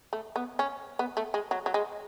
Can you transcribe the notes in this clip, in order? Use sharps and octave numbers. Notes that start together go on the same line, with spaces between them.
A3
B3
C#4
B3
A3
G#3
F#3
F#3
G#3